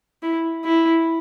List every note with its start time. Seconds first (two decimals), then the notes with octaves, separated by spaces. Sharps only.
0.22 E4
0.64 E4